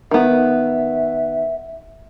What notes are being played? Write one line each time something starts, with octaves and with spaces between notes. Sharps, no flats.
D#3 B3 E5